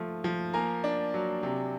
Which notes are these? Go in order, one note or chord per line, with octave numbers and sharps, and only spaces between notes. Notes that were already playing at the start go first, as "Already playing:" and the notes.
Already playing: F3 A3
F3
A#3 G#5 A#5
D4
F#3
C3